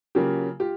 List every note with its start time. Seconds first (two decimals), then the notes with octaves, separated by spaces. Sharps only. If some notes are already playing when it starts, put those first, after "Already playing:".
0.15 C#3 F#3 A#3 F4 G4
0.60 F4 G4